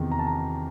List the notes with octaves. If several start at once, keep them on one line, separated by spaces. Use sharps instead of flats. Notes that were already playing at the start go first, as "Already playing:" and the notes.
Already playing: E2 C3 D#3 B3
A#5
A5
A#5